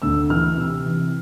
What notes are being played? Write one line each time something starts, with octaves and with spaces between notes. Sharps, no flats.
D2 E6
E3 F6
C3 E6
E3